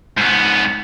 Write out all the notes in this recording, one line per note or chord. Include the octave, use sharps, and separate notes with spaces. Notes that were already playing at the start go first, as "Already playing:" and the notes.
G#2 B3